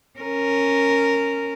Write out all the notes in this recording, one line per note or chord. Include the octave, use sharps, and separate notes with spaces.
C#4 A#4